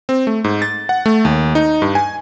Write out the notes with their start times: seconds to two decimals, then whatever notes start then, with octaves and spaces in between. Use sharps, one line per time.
0.09 C4
0.27 A3
0.44 G#2
0.62 A6
0.89 F#5
1.06 A3
1.25 D#2
1.55 D#4
1.82 G2
1.95 G#5